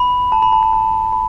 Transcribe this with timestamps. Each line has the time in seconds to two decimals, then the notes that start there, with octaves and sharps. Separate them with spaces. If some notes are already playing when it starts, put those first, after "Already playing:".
Already playing: B5
0.32 A5
0.42 B5
0.53 A5
0.63 B5
0.73 A5
1.13 B5